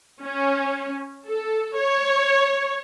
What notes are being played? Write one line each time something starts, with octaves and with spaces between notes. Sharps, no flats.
C#4
A4
C#5